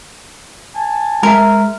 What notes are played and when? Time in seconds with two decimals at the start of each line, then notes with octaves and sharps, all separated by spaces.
0.75 G#5 A5
1.23 G#3 A#4 E5